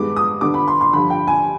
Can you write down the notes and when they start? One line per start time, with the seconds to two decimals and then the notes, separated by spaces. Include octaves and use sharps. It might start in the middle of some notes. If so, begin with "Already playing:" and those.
Already playing: G2 D#3 G#3 B3 D6
0.16 D#6
0.41 D3 G3 B3 D6
0.54 B5
0.68 C6
0.81 C6
0.93 G2 D3 F3 B5
1.10 G5
1.28 G#5